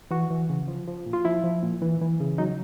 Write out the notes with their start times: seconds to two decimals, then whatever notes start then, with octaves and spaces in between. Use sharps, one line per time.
0.11 E3 F#4
0.30 E3
0.50 C#3
0.68 F3
0.88 F3
1.06 A#2
1.13 F4
1.25 F3 E4
1.43 F3
1.63 A#2
1.82 E3
2.01 E3
2.20 C#3
2.38 F#3 D#4